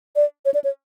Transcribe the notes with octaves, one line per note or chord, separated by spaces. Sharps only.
D5
C#5
D5
C#5